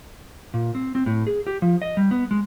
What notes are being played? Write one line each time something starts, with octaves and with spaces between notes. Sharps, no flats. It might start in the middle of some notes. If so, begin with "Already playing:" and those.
A#2
C4
C4
A2
G#4
G4
F3
D#5
G3
B3
G#3